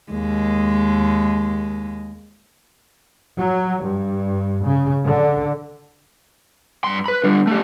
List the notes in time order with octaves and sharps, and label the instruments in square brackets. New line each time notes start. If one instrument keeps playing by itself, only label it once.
[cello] D#2 G#3
[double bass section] F#3
G2
C#3
D3
[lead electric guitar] G2 C6
B4 B5
D3 G3
A3 G4